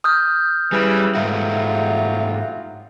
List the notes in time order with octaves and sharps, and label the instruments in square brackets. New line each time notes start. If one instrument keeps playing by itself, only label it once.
[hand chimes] D#6 F6 G6
[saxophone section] C#3 E3 [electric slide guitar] G3
[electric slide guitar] G#2 A3 F#4 [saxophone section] F#3 G3 F4 [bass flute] E5